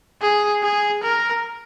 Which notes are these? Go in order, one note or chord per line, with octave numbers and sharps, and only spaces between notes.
G#4
G#4
A#4